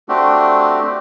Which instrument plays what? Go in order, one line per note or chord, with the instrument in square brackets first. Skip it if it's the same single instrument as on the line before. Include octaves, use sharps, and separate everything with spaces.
[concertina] A3 C4 D4 F#4 G4